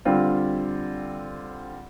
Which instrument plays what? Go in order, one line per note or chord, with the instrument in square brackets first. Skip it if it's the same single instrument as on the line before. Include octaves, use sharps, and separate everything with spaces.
[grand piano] D3 G3 C4 F4